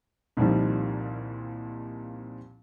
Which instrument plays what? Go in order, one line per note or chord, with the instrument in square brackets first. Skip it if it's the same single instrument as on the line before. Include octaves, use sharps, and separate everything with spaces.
[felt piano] C2 A#2 D#3 F3 G3